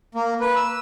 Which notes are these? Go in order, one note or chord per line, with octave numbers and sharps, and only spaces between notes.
A#3
B4
E6